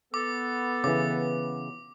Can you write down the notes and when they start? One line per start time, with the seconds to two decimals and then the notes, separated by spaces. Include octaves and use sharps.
0.14 B3 A4 D6
0.84 C#3 E3 D6